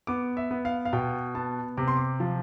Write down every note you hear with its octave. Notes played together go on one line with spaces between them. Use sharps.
B3 D6
E5
B3
F5
F5
B2 G5
B3 A5
C3 D6
C6
D6
F3